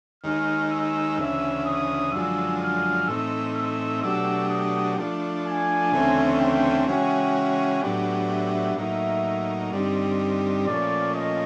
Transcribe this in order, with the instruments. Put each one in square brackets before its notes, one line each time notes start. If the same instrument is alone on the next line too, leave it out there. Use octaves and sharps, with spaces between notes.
[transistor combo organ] D#2 D#3 G#3 [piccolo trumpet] F6
[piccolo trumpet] E6
[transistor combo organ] D2 C#3 E3 [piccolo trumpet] E6
[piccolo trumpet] D#6
[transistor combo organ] F#2 D3 F3 G#3 [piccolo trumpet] E6
[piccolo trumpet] F6
[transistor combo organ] A2 E3 A3 C4 D#4 [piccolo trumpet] E6
[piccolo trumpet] E6
[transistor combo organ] B2 F#3 A3 D4 G4 [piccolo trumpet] E6
[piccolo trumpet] D#6
[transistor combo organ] F3 A3 D4
[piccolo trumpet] G#5
[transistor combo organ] D2 C#3 E3 A3 C4
[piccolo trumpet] G5
[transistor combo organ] C#3 E3 G#3 C#4 F#4 [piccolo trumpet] G5
[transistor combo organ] A2 F#3 B3 D4 G4
[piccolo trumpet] E5
[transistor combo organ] A2 F#3 A#3 D#4 [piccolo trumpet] E5
[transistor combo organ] G2 D3 G3 C4 D#4
[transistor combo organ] A#2 F3 A3 C#4 [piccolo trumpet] D5
[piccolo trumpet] D#5